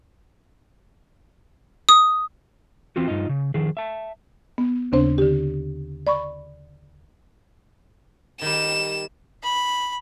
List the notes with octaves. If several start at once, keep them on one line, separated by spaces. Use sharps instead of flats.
D#6
E3 C4 F4 F#4
G2 D#4 F4 D#5
C#3
D#3 F3 G#4
E5 A5
B3
D#2 C#3 C4 D4 C5
D3 G4
D5 B5 C#6
D#3 G3 E7
B5